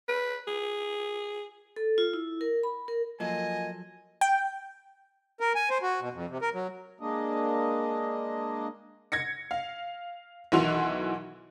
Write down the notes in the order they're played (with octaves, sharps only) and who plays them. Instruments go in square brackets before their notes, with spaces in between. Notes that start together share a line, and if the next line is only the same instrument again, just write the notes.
[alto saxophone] B4
G#4
[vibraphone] A4
F4
E4
A#4
B5
A#4
[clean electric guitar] F3 F#3 A4 [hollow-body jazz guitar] A#3 F4 [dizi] D#5 [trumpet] G#5
[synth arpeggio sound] G5
[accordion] A#4
G#5
C5
F#4
B2
F2
C3
A#4
F#3
[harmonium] G#3 A#3 D4 D#5
[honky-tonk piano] G#6 A#6 C#7
F5
B1 D#3 E3 F#4 C6 F7